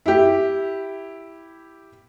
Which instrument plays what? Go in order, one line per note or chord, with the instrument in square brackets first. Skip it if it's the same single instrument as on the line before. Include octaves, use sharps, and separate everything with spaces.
[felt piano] E4 G4